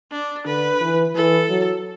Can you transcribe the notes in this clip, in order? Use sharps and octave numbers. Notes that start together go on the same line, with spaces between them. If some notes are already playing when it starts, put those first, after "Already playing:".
D4
D3 B4
E3
E3 A4
F#3